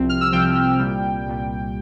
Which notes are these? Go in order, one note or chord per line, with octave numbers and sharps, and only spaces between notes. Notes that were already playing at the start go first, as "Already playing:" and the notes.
Already playing: C2 C3 F3 C4
F6
E6
C2 C3 F3 C4 G5
C2 A#2 G3
C2 A#2 G3